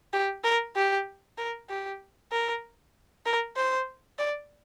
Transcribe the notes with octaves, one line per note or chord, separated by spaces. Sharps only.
G4
A#4
G4
A#4
G4
A#4
A#4
C5
D5